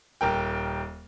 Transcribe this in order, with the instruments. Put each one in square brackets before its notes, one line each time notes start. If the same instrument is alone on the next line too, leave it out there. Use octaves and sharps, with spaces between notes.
[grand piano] D#1 A#4 G5